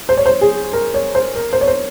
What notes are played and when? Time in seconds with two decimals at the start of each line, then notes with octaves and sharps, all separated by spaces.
0.09 C5
0.17 C#5
0.26 C5
0.41 G#4
0.73 A#4
0.94 C#5
1.15 C5
1.36 A#4
1.53 C5
1.61 C#5
1.68 C5